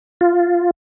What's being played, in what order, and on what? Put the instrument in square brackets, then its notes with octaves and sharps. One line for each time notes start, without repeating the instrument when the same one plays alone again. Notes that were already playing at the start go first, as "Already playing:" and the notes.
[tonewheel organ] F4